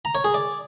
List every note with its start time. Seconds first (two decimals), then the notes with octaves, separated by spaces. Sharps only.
0.05 A#5
0.15 C#5
0.24 G#4
0.34 D5